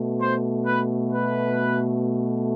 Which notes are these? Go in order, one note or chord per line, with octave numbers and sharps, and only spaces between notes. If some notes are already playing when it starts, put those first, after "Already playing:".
Already playing: B2 A3
C5
B4
B4